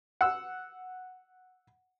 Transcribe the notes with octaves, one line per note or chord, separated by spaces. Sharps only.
F#5 E6